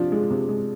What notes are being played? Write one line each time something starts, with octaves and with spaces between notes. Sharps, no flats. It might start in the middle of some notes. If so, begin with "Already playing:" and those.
Already playing: C3 F3 D4
G#3
C3
G#3